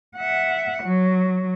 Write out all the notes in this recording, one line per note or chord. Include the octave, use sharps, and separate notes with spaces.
E5 F#5
F#3